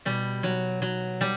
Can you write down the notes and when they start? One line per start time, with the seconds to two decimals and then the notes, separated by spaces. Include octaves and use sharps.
0.05 B2 G3
0.43 F#3
0.82 F#3
1.21 G3